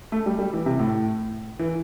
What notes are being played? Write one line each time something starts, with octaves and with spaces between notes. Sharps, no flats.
A3
G3
G3
E3
C3
A2
E3